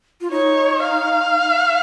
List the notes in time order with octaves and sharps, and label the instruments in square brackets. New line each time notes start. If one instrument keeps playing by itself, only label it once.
[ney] F4
[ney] D#4 [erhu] C#5
[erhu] F5